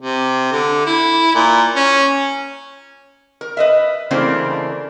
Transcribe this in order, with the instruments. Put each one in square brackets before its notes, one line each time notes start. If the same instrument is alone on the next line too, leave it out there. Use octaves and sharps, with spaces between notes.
[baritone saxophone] C3
D3
E4
A#2
C#4
[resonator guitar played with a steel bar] A#4
B4 D#5 E5
C#3 E3 A3 A#3 C4 D4